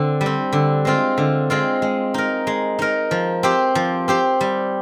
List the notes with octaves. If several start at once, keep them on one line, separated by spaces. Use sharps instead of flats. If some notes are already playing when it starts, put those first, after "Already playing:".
Already playing: D3 C4
G3
C4
D3
G#3 C4 F4
D3
G#3 C4 F4
G#3
D#4 A#4
G#3
D#4 A#4
F3
C4 G4 C5
F3
C4 G4 C5
G3